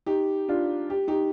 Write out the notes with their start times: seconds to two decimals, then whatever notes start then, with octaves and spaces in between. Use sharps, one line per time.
0.06 D#4 G4
0.49 D4 F4
0.90 G4
1.08 D#4 G4